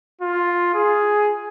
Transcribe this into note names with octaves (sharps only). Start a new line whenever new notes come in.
F4
G#4